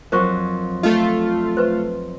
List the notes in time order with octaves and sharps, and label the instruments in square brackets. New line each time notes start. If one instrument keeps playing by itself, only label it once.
[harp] F2 F#3 [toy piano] A#4 C5 C#6
[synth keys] A3 F4 [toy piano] D#5
[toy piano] B4 C5